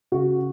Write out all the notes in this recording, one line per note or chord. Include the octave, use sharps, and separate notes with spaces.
C#3 F#4